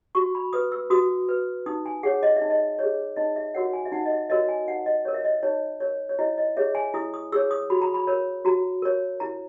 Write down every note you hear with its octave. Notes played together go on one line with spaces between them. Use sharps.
F#4 C#6
B5
B4 D#6
E6
F#4 D#6
B4
D#4 D#6
G#5
G#4 C#5 F#5
D#5
E5
D#4
D#5
G#4 C#5
D#4 D#5
E5
F#4 A#4 C#5 F#5
G#5
E5
D#4 F#5
D#5
E5
F#4 A#4 C#5 D#5
G#5
D#4 F#5
D#5
A#4 C#5
E5
D#5
D#4 C#5
A#4 C#5
C#5
E4 D#5
D#5
G#4 C#5 E5
G#5
E4 D#6
D#6
G#4 C#5 E6
D#6
F#4 B5
A#5
B5
A#4 C#5
F#4 A#5
A#4 C#5
E4 A#5